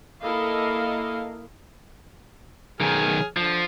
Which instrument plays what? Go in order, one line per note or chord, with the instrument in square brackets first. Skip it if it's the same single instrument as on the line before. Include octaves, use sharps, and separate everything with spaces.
[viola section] A#3 E4 A4 A#4 D#5 F5
[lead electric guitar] B1 D#3 [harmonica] G#4 F6
[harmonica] D3 [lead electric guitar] F3